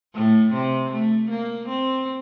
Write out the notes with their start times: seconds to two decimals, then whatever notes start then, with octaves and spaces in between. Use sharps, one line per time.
0.14 A2
0.53 C3
0.91 A3
1.30 A#3
1.68 C4